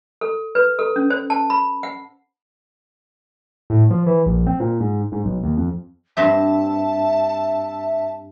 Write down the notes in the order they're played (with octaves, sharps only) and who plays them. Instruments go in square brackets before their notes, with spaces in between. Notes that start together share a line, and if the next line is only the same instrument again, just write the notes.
[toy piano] A4
B4
A4
C#4
C5
A5
B5
F#5
[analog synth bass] A2
F3
E3
A#1
C4
A#2
G#2
G#2
B1
D#2
F2
[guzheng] G2 C4 G4 [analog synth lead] E5 [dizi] A5